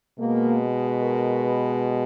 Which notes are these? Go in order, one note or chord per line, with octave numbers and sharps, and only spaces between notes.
B2 G#3 A#3
A#4
B4